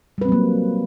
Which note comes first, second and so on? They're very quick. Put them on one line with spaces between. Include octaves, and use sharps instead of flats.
G3 B4 C4 F#3 A#3